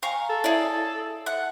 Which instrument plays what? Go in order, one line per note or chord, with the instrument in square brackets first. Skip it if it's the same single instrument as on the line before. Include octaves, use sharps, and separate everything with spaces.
[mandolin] F5 A#5 C#6 [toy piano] G5 G#5
[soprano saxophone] A4
[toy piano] E4 C#5 E5 [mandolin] G#4 D5
[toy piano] E5 [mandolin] F#5